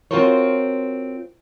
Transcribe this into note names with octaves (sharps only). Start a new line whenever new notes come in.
C4 F4 F#4 A#4 C5 C#5